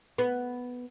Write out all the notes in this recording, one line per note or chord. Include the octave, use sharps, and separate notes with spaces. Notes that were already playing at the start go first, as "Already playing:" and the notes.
B3